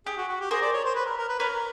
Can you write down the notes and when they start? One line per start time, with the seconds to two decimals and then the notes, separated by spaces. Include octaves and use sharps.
0.06 G4 G#4
0.17 F#4
0.28 F#4
0.40 G4
0.51 G#4 A#4 C5
0.62 D5
0.73 C#5
0.85 C5
0.95 B4
1.06 A#4
1.17 A#4
1.28 B4
1.40 A#4 B4 C#5